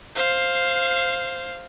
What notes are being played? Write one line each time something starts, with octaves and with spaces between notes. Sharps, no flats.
C5 F5